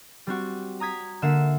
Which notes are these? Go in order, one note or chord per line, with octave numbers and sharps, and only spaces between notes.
G3 C4 F#4
A#5 D#6 G#6 B6
D3 A#3 E5 F#5 E7